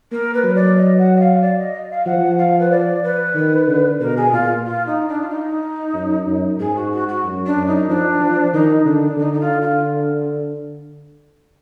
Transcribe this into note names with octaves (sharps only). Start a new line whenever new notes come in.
A#3 A#4
B4
F#3
D5
D#5
F#5
D#5
F5
D5
D#5
D#5
F5
F3 F#5
F5
B4
D5
B4
D#3
D3
B2 A#4
G#4
A#2 F4
F4
D#4
D4
F4
D#4
F#2
F#2
G#2 G#4
F#4
F#4
F#4
F#2
D4
F#2
D#4
F3 D4
F3
D#3 D#4
D3 D4
D3 D#4
D#4
F4
F4